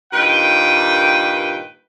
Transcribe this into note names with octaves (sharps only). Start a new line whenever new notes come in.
G2 A#2 D#3 B4 G5